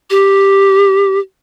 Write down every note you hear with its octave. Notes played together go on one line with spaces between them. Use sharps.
G4